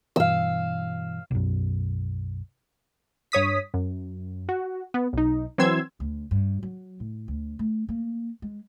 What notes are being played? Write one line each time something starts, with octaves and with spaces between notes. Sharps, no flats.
G2 B2 E3 F5 E6
B1 F#2
G2 C#5 D#6 B6
F#2
F#4
B3
B1 D#4
E3 F#3 C4 C6 E6 G#6
D2
G2
F#3
A2
D2
A3
A#3
G#3